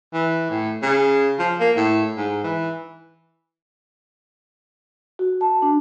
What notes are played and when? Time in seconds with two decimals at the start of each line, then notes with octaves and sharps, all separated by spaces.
0.13 E3
0.50 A2
0.82 C#3
1.39 F3
1.60 A#3
1.77 A2
2.17 G#2
2.44 E3
5.19 F#4
5.41 A5
5.62 D4